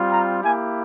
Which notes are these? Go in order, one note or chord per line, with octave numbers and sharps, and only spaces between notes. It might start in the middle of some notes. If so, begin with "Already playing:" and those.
Already playing: G3 C4 F4
A#5
A#3 E4 G4 G#5